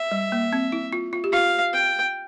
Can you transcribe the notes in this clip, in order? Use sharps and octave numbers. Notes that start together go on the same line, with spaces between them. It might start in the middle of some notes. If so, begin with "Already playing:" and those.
Already playing: E5
G3
A#3
C4
E4
F4
F4
G4
F4 F5
G5